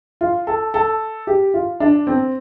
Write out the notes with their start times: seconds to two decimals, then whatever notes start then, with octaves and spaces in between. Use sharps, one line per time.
0.21 F4
0.47 A4
0.74 A4
1.27 G4
1.54 F4
1.80 D4
2.07 C4